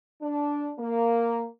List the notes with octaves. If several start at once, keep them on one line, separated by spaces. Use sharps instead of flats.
D4
A#3